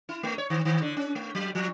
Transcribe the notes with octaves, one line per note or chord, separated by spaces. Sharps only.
E4
A3
C#5
D#3
D#3
D3
C#4
A3
F#3
F3